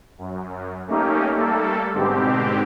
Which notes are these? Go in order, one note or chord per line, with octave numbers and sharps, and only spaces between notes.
F#2
A3 A#3 C#4 D#4 G4
G3 A3 A#3 A4
G#2 B2 D3 C4 G4